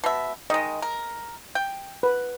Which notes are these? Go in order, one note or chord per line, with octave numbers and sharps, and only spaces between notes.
B2 E5
D#3 G#3 D#5
A#4
G5
B4